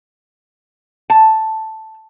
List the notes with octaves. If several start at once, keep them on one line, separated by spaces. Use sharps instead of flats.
A5